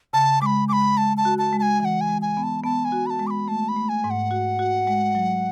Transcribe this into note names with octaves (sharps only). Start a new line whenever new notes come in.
C#3 A5
G#3 B5 D6
G#3 B5 D6
G#3 A5
A5
F#4
A5
G#3
A5
G#5
E3 F#5 G#5
G#5
G#3
G#5
B3
A5
B3 A5
G#5
F#4
B5
A5
G#3
D6
B5
A3 A5
B5
A3
G#5
G#2
F#5
F#4
F#4
G#3
F#3